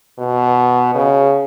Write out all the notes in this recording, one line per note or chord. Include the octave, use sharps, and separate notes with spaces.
B2
C#3